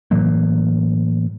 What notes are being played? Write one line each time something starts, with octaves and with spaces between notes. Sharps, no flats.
A2 E3 F#3 A#3